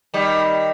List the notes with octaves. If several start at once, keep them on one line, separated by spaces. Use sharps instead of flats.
D#3 G3